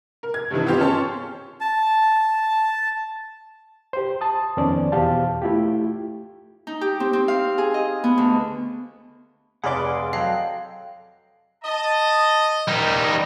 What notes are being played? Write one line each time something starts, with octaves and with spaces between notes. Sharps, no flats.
A#4
G#6
G2 C3 D#3 E3
B3 C4 F4 G4 C5
C#4 G#4 C#5 A5 C6 C#6
A5
G4 C5
A5 D#6
F2 D#3 B3 C#4 C5 D5
E2 B2 G4 C5 F5 A5
A3 E4 F4 G4
D#4
G4
C4
C4
F5
G#4
D#5
B3
D2
F1 G#4 D5 F5 F#5 B5 C6 D6
F#3 A4 D#5 F5 G5
D#5 A5
G3 D#4 A#4